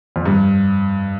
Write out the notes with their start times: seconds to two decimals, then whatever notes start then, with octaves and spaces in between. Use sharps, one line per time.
0.16 F2
0.26 G2